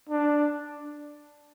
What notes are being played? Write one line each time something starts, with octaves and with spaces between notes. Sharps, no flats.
D4